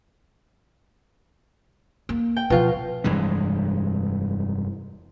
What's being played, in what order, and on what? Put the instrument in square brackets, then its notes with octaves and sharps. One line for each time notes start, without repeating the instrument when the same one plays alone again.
[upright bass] A#3
[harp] G5
[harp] B2 F4 [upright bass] F3
[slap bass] F1 G2 E3 G#3